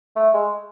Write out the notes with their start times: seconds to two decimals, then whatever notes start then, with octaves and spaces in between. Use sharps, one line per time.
0.16 A3
0.34 G#3